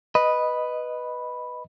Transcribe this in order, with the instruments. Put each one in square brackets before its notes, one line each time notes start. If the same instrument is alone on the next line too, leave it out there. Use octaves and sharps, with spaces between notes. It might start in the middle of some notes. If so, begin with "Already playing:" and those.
[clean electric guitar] B4 [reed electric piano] D#5